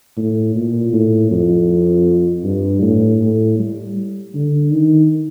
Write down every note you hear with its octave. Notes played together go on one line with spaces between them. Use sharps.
A2
A#2
A2
F2
G2
A2
A2
G3
D3
D#3